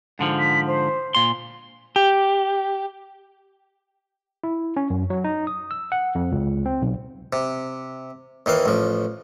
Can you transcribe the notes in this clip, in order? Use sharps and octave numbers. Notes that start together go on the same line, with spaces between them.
G#2 D3 F3
B6
C5
A#2 C6
G4
E4
C#4
F#2
F#3
D#4
D#6
E6
F#5
F2
C#2
C4
B1
C3
D#2 D#3 E3 F5
A1 F3